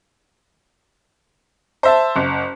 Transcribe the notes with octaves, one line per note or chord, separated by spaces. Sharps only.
C5 E5 A5
F#1